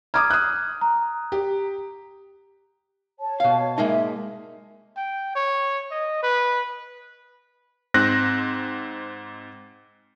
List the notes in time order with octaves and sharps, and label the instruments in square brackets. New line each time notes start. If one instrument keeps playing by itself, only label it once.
[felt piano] A#5 D6 D#6 [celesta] F6 G#6
[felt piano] D#6 F#6
[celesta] A#5
[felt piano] G4
[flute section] C#5 A5
[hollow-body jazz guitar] B2 F5
[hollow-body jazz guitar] G#3 A#3 D#4 [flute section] E5
[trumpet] G5
C#5
D#5
B4
[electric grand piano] G#2 C4 F#6 A#6